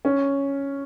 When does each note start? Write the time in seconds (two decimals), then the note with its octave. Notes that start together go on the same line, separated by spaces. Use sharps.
0.05 C#4